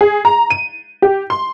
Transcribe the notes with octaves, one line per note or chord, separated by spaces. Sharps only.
G#4
A#5
D#7
G4
C6